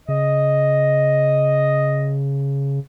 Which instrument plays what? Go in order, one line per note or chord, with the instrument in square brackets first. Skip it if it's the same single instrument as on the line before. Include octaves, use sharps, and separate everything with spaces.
[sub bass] C#3 [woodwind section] D#5